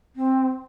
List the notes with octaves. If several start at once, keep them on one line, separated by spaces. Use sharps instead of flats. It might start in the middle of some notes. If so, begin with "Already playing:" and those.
C4